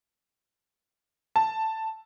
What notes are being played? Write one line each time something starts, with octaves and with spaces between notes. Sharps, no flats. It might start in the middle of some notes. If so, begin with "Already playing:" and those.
A5